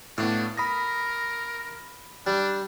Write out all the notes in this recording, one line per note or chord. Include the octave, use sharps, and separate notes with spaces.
A2 A3 B3 D4 F5
A#4 B5 D#6 A#6
G3 D4